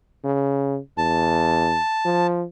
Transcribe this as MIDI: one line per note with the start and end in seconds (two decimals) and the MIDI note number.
0.24 0.79 49
0.98 1.79 40
0.98 2.27 81
2.05 2.45 53